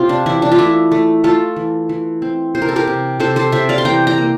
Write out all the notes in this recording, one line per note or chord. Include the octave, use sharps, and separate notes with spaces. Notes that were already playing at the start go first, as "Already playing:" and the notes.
Already playing: C3 C4 F4
D4
E3 E4
D4
F4
A3 E4
A3
A3 F4 A4
E3
E3
C4
C3 C5
A#4
A4
G4 A#4
C3
C3 A4 C5
A4 C5
C3 C5 E5
D5 F5
C6
E3 G5 A#5
G5 A#5
A#3